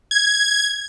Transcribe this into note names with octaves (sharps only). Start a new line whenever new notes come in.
G#6